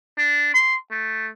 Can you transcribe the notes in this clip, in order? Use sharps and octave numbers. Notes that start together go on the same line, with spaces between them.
D4
C6
A3